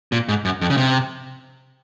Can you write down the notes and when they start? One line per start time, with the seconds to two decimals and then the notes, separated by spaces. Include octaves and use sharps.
0.12 A#2
0.29 G#2
0.45 F#2
0.61 F2
0.70 C#3
0.77 C3